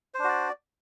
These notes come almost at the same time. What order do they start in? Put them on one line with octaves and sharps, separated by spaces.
C5 D4 F#4 D5